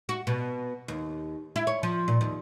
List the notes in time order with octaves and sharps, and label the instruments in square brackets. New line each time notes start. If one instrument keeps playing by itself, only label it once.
[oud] F#4
B2
D#2
E4
C#5
F3
A#2
D#2